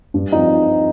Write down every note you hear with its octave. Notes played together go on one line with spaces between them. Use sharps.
G2
F3 C4 D#4